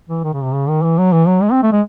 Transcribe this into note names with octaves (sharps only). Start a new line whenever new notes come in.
E3
D#3
C#3
C3
C#3
D#3
E3
F#3
E3
F#3
G#3
C4
A3
G#3